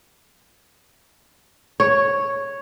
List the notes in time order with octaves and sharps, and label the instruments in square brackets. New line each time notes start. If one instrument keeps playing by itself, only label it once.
[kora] C#5